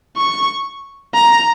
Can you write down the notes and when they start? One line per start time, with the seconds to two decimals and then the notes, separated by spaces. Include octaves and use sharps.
0.17 C#6
1.14 A#5